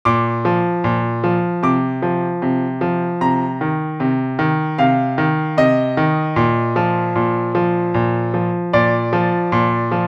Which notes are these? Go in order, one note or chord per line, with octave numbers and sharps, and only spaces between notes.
A#2 D6
F3
A#2
F3
C3 D6
F3
C3
F3
C3 A#5
D#3
C3
D#3
C3 F5
D#3
C3 D#5
D#3
A#2
F3
A#2
F3
A#2
F3
A#2 D5
F3
A#2
F3